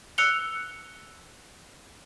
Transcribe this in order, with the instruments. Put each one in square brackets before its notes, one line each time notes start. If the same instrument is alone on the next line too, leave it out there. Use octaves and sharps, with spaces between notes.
[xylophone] E6 F#6 C#7 F7 G7